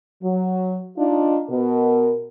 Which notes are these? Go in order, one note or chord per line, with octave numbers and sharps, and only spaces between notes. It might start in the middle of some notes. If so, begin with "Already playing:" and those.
F#3
D4 D#4 F4
B2 A#4